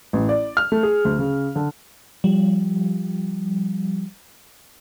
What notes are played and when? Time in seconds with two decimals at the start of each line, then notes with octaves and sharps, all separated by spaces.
0.13 A1
0.29 D5
0.57 F6
0.72 A3
0.83 G#4
1.05 D2
1.19 C#3
1.56 D3
2.24 F3 G3